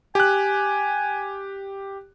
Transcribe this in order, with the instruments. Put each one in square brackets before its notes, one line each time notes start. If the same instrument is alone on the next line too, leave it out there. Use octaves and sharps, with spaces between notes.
[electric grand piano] G4 F#6 [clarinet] G#5